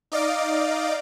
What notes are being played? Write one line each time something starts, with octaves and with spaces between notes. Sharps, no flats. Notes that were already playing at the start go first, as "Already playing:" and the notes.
D#4 D5 D#5 F5 D6